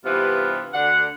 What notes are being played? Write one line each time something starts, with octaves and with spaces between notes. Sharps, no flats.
G2 C3 E3 B3 F4
D2 D3 D4 F#5